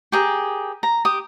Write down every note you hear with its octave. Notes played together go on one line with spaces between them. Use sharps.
G4 G#4 A#4
A#5
G4 D#6